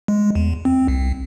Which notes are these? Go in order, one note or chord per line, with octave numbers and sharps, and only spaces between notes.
G#3
E2
C4
C2